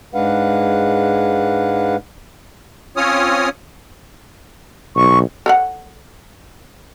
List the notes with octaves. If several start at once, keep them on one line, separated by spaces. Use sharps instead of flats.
G#2 G#3 D4 B4 F5 F#5
C4 C#4 F4 C#5 D#6 F6
B1 C#6
A4 C#5 F#5